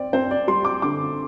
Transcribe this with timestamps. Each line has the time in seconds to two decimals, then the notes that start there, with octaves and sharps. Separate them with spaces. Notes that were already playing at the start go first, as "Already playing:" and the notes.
Already playing: C4 D5
0.13 C4 C5
0.31 D5
0.48 G3 C6
0.65 D6
0.82 D3 D6